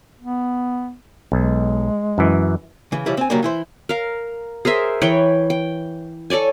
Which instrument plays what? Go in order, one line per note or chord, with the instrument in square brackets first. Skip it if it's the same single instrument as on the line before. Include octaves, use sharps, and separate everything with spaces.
[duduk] B3
[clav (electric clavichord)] B1 [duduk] G#3
[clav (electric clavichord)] F#2 E3
[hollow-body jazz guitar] C#3 E3
C#3 E3 F3 G3 E4
C4 G#5
C#3 F#3 G3 A#3
E3 E4 C5
[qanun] A#4 F5
G#4 A#4 C5 E5
E3 B4 C#5 G5
G5
A4 C#5 D5 G#5